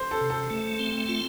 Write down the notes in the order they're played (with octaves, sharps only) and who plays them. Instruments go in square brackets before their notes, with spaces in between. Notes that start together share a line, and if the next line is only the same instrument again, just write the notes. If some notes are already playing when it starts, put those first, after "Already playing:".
Already playing: [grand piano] C5
A4
[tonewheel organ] C3
[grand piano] A4
[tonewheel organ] A3
C4
F4